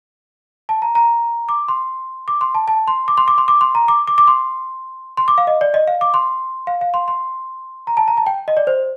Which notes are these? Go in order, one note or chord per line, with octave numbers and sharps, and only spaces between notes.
A5
A#5
A#5
D6
C6
D6
C6
A5
A5
C6
D6
C6
D6
C6
D6
C6
A#5
D6
D6
D6
C6
C6
D6
F5
D#5
D5
D#5
F5
D6
C6
F5
F5
C6
C6
A#5
A5
A#5
A5
G5
D#5
D5
C5